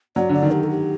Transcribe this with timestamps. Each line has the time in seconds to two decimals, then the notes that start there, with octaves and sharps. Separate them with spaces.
0.16 F#3 D5
0.29 D3 D5
0.43 D#3
0.52 G4
0.64 A4
0.70 G4